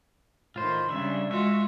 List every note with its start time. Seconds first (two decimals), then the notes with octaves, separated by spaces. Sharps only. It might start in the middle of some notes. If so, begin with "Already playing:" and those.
0.56 A2 D#3 F4 C5 B5 C6
0.89 C#3 G3 D4 E5
1.31 G#3 F4 F#4 E5